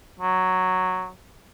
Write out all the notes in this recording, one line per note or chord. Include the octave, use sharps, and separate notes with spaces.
F#3